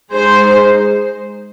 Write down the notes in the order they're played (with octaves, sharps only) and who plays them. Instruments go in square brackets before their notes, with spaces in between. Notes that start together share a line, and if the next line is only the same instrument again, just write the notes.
[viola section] G#3 D#4 G#4 C5